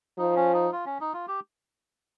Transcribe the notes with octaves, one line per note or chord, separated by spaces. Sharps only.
F3 D#4
C#4
D#4
F4
C#4
D#4
F4
G4